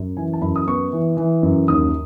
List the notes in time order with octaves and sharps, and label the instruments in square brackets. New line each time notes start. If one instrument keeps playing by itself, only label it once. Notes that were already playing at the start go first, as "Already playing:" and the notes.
Already playing: [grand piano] F#2
E3 G#5
A5
F#2 B5
D#6
B3 C#6
E3
E3
F#2
D#2 D#6